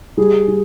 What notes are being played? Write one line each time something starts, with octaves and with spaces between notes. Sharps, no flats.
G3 G#4
G3